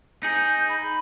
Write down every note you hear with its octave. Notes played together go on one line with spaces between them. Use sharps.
D#4 G#4 G6
B5